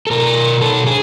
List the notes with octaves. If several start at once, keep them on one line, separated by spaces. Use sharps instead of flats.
A4
B2 A#4
A4
G#4